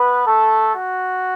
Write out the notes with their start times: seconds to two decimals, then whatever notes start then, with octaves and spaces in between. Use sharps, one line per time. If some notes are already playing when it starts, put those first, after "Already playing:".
Already playing: B3 B4
0.25 A3 A4
0.72 F#4